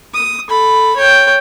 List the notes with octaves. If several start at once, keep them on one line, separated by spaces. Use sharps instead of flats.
D#6
A4 B5
C#5 G5